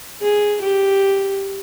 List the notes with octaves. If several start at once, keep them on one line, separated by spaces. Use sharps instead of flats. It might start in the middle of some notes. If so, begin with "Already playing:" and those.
G#4
G4